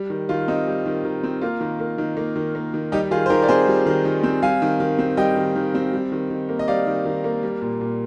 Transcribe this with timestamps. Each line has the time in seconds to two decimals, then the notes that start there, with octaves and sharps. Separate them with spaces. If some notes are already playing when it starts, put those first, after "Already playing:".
Already playing: G3
0.10 D#3
0.29 D#3 F4
0.48 C4 D#4
0.67 G3
0.86 D#3
1.05 D#3
1.23 C4
1.41 A#3 F4
1.60 D#3
1.80 A#3
1.98 D#3
2.17 A#3
2.36 D#3
2.55 A#3
2.74 D#3
2.92 G3 D#4 G4
3.11 D#3 F4 G#4
3.26 C5
3.30 D#3 G4 A#4
3.42 D5
3.49 C4 G#4 C5
3.67 G3
3.86 D#3
4.05 D#3
4.23 C4
4.42 G3 F5 G#5
4.62 D#3
4.80 D#3
4.99 C4
5.17 G3 D#5 G5
5.37 D#3
5.56 D#3
5.74 C4
5.93 G3
6.12 D#3
6.30 D#3
6.49 A#3
6.59 D#5
6.68 G3 D5 F5
6.87 D#3
7.05 D#3
7.24 A#3
7.43 G3
7.62 A#2
7.81 A#2